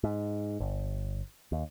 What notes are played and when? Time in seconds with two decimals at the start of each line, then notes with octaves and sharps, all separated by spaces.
0.04 G#2
0.60 G1
1.52 D#2